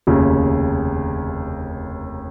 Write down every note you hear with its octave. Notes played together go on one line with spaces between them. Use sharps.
F1 D#2 C#3